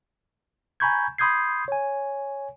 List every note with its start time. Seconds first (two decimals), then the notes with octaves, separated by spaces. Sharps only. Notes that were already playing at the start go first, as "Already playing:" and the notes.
0.80 G#5 A#5 B5 C#6 G6 G#6
1.18 B5 C6 D#6 G6 G#6 C7
1.68 C#5 G#5